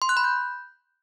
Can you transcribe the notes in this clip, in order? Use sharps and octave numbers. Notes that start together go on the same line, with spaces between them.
C6
F#6
B5
G6